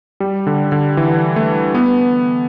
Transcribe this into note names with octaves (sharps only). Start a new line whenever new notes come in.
G3
D3
D3
E3
A3
B3